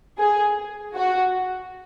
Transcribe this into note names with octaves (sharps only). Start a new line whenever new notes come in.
G#4
F#4